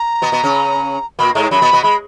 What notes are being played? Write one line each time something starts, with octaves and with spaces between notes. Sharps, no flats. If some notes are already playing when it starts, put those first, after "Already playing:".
Already playing: A#5
B2 B3
B2 B3
C#3 C#4
A#2 A#3 B5
G#2 G#3 A#5
F#2 F#3 B5
B2 B3
B2 B3
G#3 B5